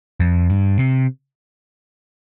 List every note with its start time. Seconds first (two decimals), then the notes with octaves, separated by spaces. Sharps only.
0.20 F2
0.50 G2
0.79 C3